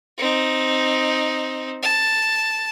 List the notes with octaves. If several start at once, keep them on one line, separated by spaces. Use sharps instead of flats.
C4 D#4
A5